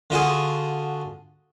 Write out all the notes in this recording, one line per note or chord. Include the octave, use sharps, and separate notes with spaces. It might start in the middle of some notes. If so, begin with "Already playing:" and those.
D3 F4 F#4 G#4